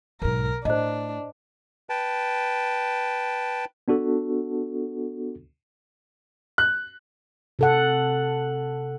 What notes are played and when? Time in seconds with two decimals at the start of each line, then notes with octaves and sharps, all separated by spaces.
0.22 B1 G#2 A#4
0.65 A2 D4 C5 D#5
1.90 B4 G5 A5
3.88 B3 D4 F#4 A4
6.58 F#6
7.59 C3 A4 F#5